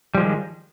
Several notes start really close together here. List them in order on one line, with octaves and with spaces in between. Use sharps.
G3 F3 G#3 D#3